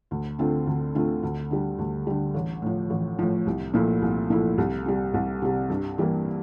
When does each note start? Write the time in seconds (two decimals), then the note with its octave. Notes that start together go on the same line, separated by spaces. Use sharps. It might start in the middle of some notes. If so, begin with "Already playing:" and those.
0.11 D2
0.38 D3 A3 C4 F4
0.67 D2
0.95 D3 A3 C4 F4
1.23 D2
1.51 D3 G3
1.79 D2
2.07 D3 G3
2.34 A1
2.62 A2 F3
2.90 A1
3.19 A2 F3
3.47 C2
3.74 A#2 F3 A3 E4
4.02 C2
4.30 A#2 F3 A3 E4
4.58 C2
4.86 C3 G3
5.14 C2
5.42 C3 G3
5.70 G2
5.98 E3 G3 A#3